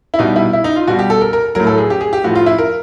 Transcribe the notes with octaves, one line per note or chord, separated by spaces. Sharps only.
E4
B2 G3 D#4
E4
E4
D#4
F4
B2 G3 F#4
G4
A4
A#4
A#4
A2 F#3 A#4
A4
G#4
G4
G#4
G4
A2 F3 F#4
F4
E4
A#4